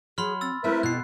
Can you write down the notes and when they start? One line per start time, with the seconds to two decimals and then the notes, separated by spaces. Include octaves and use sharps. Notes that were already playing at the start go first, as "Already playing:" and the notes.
0.18 F#3 G#4 B5 C6 F6
0.41 C4 E6 A6
0.64 G3 A3 C4 E4 A#4 B4 E5
0.83 F2 B2 F#6 C7